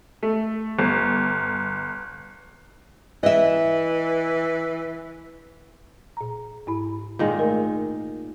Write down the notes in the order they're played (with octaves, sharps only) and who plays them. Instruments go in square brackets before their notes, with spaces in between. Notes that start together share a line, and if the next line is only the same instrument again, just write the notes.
[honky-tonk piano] A3
G1
[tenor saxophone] E3 [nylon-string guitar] D#5 E5
[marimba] A#2 A#5
G#2 E4 B5
[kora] A#2 D#3 G#3
[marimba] A3 A#4 D#5